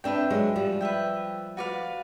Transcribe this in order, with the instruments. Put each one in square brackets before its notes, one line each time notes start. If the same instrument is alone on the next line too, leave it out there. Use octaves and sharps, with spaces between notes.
[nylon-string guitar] C4 D4 [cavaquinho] B4 E5 G5
[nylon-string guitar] F#3 G#3
F3 G3
[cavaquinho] B4 E5 G5
F#4 B4 D5 F5